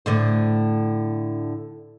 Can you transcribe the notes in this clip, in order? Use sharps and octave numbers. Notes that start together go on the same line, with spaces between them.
A2 D3 C5